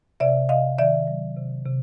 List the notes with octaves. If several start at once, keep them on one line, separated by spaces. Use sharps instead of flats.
C3 D5 E5
C3 D#5 F5
D#3 D5 E5
F#3
C3
C3